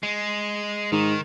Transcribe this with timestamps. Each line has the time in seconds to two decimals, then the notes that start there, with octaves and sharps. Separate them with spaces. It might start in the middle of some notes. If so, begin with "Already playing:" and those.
0.03 G#3
0.92 G#2 D#3